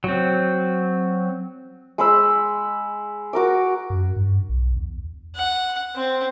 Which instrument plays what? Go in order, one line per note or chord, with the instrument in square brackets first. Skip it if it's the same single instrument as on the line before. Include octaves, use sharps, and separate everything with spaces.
[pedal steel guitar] F#3 C4
[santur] G#3 B5 E6
F#4 A#4 D6
[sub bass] F#2
G2
B1
E2
[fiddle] F#5
C4